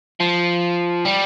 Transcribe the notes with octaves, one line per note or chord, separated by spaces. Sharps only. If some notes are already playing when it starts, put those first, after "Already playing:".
F3
G3